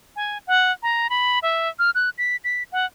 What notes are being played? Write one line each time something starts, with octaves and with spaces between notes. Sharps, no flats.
G#5
F#5
A#5
B5
E5
F6
F#6
B6
B6
F#5